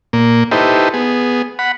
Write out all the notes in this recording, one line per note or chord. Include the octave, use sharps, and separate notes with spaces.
A#2 A#3
D#4 E4 G4 A4 B4 C5
B3 G#4
F#5 B5